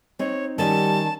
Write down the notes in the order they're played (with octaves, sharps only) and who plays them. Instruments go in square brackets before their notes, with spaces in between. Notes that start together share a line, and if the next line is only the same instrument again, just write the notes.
[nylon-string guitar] C4 D#4 [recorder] C#5
[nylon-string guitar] D#3 C#4 [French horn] G3 [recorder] A5